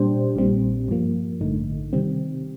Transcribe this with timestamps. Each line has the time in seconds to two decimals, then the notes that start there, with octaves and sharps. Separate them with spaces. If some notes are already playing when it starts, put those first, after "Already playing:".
Already playing: A#2 G3 D4 G4 C5
0.36 A#1 A#2 G3 C4
0.88 G2 F3 A#3
1.41 A1 G2 D3 A3 D#4
1.93 C3 D#3 G3 C4